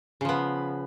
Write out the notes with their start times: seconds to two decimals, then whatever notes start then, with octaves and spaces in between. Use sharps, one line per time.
0.21 C#3
0.25 F3
0.29 B3